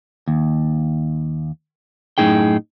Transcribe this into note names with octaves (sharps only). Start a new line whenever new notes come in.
D#2
F#2 A2 D#4 G#4 G5